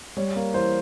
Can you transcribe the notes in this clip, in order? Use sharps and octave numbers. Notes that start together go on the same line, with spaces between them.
G3 C#5
A#3
E3 C5